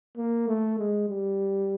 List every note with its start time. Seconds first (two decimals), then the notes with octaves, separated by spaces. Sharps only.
0.17 A#3
0.48 A3
0.78 G#3
1.09 G3